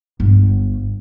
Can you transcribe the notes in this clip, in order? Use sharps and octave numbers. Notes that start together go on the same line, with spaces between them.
G1